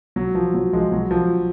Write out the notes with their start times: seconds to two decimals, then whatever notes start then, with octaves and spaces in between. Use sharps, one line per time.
0.16 F#3
0.35 F3
0.54 F#3
0.73 F3 G#3
0.92 F#3
1.11 F3